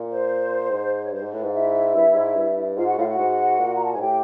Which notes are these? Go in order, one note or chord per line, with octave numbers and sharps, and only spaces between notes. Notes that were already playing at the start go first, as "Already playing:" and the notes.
Already playing: A#2
C5
G#2
C#5
G2 C5
G#2
A2 B4
G#2
F5
E4 E5
G2
G#2
G2
G#2 F4 F5
F#4 F#5
A2 F4 F5
F#4 F#5
G#2
A#2
A#5
A5
G#5
G#2
A2 G4 G5